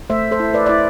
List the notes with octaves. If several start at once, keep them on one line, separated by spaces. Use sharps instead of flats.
A3 C5 E5
A4 C5
E4
B4 D5
E4 D5